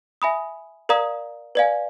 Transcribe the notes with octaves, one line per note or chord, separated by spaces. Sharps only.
E5 G#5 B5 D#6
A#4 D5 F5 A#5 D#6
B4 D5 F5 G#5